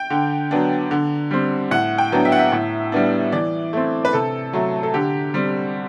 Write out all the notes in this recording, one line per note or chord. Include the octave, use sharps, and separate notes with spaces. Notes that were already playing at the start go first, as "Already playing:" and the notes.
Already playing: G5
D3
F#3 B3 D4
D3
G3 C4
A2 F#5
G5
F#3 B3 D4
E5
F#5
E5
A2
G3 B3 D4
E3 D5
A3 C4
B4
C3 A4
F#3 A3
A4
D3 G4
G3 C4